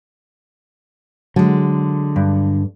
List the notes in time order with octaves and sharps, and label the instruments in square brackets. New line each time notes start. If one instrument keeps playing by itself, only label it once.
[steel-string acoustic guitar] D3 G#3 [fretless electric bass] F#3
[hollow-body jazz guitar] G2